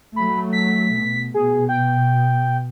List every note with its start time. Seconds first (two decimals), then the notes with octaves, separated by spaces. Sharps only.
0.16 F#3 A3 B5
0.53 B6
0.92 B2
1.34 B2 G#4
1.69 G5